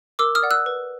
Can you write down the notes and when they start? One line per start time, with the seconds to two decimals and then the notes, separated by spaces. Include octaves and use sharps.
0.19 A#4 D6 E6
0.35 D#6 F6
0.43 D5 F#5
0.51 E6 F#6
0.66 B4